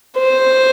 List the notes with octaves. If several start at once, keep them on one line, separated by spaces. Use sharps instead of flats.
C5